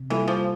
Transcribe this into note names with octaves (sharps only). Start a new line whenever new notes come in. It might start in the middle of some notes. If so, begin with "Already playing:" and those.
Already playing: C3
E3 G3 A#3 F4 A4
F3